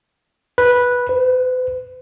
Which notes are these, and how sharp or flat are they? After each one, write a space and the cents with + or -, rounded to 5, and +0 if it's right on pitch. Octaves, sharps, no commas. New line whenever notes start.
B4 -10
B4 +45